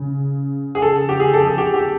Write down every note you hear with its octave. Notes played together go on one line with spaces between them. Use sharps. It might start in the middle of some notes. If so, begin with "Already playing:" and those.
Already playing: C#3
G#4
A4
G4
G#4
A4
G#4
G4
G4